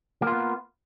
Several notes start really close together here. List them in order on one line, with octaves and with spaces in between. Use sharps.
A#3 F4 B3